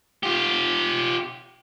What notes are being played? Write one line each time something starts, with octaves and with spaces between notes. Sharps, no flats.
F4 G4